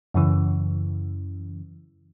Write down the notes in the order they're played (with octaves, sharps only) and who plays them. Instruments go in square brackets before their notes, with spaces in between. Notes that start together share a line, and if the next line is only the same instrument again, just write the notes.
[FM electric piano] F#2 C#3 E3